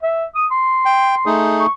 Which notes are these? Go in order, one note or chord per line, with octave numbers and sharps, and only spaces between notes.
E5
D#6
C6
G5
A3 D#4 G#4
C#6